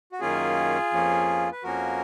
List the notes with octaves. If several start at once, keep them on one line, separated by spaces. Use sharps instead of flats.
F#4
F#2 D#3 A#3 C#4 F4 G#4
F2 F3 A#3 C#4
B4
F2 F3 A#3 C#4 F#4 A#4